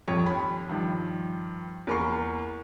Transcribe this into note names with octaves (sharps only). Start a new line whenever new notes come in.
A#1 F2 C#5
D#2 B5
G2 D#3 F3
E2 A#3 A#4 B5 C#6 C7